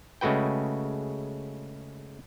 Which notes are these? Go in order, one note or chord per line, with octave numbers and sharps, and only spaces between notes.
C#3 G#3 A3 F#4 B4 G5